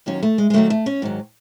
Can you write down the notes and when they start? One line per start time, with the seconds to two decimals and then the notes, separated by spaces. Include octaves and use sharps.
0.06 D#2 D#3 F#3 C#4
0.23 A3
0.38 G#3
0.50 G#3
0.53 D#2 D#3 F#3 A3
0.70 A3
0.86 C#4
1.02 G#2 D#3 F#3